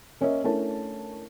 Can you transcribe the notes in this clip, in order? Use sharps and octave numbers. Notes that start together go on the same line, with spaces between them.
A#3 C#4 A#4 D#5 E5
A3 C#4 D4 E4 A#4 A5